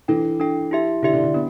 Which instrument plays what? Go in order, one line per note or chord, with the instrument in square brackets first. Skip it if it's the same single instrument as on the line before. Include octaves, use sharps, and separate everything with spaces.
[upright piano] E3 [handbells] D4 A4 G5
[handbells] D4 A4 G5
E4 G4 E5
[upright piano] D3 [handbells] E4 G4 E5
[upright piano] D3
D3
[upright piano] B3 [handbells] D4